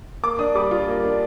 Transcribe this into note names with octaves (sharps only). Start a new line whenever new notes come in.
A#3 D6
D4 D#6
G3 D6
F4
A#3
D4